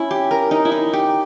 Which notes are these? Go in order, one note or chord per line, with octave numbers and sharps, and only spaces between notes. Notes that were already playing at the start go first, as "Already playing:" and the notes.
Already playing: C#4 E4
G4
A#4
D#4
E4
D#4
G4